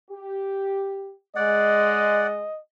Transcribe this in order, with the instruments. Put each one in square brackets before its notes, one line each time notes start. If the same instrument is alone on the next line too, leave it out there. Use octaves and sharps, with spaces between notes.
[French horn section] G4
[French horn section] G#3 [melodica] D5 F#5 [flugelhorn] D#5